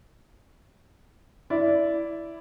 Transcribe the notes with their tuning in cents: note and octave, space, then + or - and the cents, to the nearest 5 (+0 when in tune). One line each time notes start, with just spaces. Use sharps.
E4 +0 D5 -15